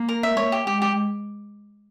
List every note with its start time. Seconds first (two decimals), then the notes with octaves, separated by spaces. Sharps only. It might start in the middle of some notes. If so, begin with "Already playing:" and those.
Already playing: A#3
0.09 A#4
0.23 E5
0.37 A#3 C#5
0.52 G4
0.67 G#3 G4
0.82 G4